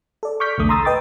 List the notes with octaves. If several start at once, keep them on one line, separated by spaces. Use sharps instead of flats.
A4 D5
C#6 D6 F6 G6 B6
B1 E2 D3 A3 D#6
A#5 C6 D#6 E6 A6
B4 D#5 G5 D6 A6